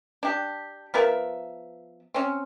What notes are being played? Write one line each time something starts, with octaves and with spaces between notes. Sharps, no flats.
D4 G4
F3 B3 A#4 E5
C4 C#4